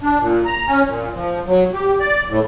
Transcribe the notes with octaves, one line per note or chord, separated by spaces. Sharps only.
D4
A#2
A#5
C#4
A#2
F3
F#3
G4
D5
A2